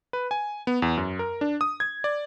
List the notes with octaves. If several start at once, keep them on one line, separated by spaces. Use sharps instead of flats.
B4
G#5
B3
E2
F#2
A#4
D4
D#6
G#6
D5